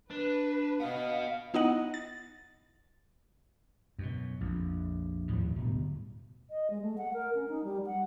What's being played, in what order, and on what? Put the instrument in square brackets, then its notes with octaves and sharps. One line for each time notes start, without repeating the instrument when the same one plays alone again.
[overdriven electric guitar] D4 [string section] B4
[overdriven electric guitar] B3 D#5 [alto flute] F5
[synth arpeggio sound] B3 D#4 E4 D#5 F#5
A6
[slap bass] F#2 B2
A#1 F2
D#2 A2 F3 G3
D1 G2 B2
[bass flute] D#5
G#3
A3
F#5
A#4
C#4
D#4
G3
F#5